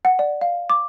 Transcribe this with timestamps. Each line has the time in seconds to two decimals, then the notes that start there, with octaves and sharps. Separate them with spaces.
0.05 F#5
0.19 D5
0.41 F5
0.70 D6